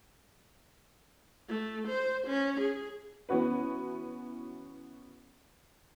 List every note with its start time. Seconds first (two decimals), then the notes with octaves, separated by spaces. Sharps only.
1.49 A3
1.88 C5
2.27 C#4
2.61 G#4
3.29 E3 B3 C#4 F#4 B4